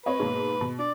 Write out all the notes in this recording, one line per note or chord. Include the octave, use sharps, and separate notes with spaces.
C4 B4 C#5 D#5
G#2 B2 A#3
B2
D4 D5